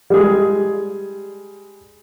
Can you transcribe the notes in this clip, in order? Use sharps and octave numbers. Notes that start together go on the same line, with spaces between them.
G3 G#3 G#4